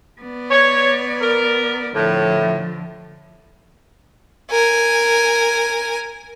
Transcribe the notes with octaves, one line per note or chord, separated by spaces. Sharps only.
B3 D5
C#5
A#4
A2 D3 F3
A#4 G#5